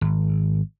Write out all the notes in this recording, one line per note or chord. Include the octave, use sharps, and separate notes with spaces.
G#1